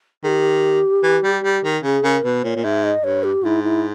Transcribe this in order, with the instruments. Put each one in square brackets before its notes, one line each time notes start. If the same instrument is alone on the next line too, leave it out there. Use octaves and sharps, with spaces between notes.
[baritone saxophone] D#3 [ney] G#4
[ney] G4
[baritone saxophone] E3
G3
G3
D#3
[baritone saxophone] C#3 [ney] G#4
[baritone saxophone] C#3 [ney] A#4
[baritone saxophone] B2 [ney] B4
[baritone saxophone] A#2 [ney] C#5
[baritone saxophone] A#2
[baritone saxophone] G#2 [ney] E5
[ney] D#5
[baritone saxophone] G2 [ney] C#5
[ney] G4
[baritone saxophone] G#2 [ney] E4
[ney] E4